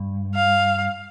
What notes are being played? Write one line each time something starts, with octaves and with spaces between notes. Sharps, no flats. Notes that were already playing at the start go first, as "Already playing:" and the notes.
Already playing: G2
F5